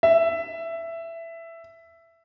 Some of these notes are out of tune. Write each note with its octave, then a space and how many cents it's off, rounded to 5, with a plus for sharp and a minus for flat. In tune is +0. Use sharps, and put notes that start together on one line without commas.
E5 +10